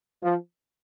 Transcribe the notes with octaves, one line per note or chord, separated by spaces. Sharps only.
F3